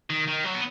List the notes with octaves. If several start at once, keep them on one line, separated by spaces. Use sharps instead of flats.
D#3
D#3
F#3
B3